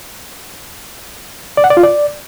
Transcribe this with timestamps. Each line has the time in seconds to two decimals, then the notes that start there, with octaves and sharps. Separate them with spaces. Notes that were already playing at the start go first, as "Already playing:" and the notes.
1.57 D5
1.64 F#5
1.70 D5
1.77 F4
1.83 D5